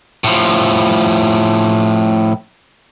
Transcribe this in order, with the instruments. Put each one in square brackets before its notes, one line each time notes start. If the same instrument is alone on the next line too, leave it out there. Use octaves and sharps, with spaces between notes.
[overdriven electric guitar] A2 F3